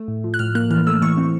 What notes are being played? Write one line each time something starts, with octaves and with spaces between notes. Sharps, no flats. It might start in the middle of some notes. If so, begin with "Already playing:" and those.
Already playing: A3
A2
F3
F#6
A2 F6
A#3 F#6
E3 F6
A3 E6
E3 C#6
C4